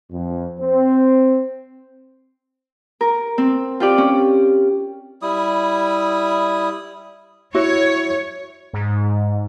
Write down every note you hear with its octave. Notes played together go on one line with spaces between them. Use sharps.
F2
C4
A#4
C4
F4 G4 D5
C#4
G3 E4 D#6
E4 F#4 C#5
G#2